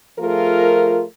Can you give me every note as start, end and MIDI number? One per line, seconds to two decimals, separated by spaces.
0.19 1.03 53
0.19 1.03 57
0.19 1.03 65
0.19 1.03 68
0.19 1.03 70